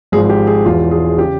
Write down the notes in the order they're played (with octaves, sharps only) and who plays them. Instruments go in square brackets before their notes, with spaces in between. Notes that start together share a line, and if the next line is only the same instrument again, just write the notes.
[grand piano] G#1 G#2 F3 G#4
G4
G#4
E1 E2 E3 F4
G#4
C#3 G4